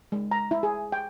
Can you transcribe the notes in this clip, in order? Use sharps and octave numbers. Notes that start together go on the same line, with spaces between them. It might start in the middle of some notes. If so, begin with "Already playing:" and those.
G#3
A#5
E4
G#4
G5